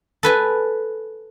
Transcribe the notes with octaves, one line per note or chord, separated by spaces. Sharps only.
A4 B4 G#5